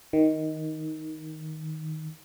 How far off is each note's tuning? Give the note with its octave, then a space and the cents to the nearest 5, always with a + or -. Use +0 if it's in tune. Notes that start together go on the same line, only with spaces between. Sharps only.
D#3 +10